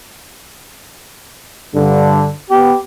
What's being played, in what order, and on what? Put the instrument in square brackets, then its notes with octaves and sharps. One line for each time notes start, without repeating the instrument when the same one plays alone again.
[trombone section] G2 D3
[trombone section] B3 [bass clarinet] G4